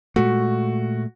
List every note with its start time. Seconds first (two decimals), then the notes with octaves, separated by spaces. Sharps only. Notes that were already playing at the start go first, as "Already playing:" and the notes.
0.16 A#2 G#3 A3 F#4